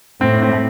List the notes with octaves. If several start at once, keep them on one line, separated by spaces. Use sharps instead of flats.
A2 C4
C4